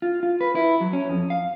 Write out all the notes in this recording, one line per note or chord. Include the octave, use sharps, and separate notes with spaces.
F4
F4
B4
E4
F#3
C#4
F2
F5